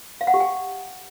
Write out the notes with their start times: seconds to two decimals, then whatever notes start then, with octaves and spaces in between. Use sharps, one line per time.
0.21 F5
0.27 F#5
0.34 G4
0.40 G5